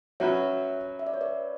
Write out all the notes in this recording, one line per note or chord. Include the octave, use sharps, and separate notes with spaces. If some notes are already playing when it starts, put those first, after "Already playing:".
F#3 C#4 F#4 B4 C#5 E5
E5
D5
C#5
B4 D5